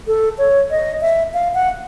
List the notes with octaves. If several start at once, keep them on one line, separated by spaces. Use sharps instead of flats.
A4
C#5
D#5
E5
F5
F#5